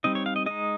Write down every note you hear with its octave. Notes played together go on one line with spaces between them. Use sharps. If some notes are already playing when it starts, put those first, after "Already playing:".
G3 C4 D#4 D#5
C#5
F5
D#5
G#3 D#4 D#5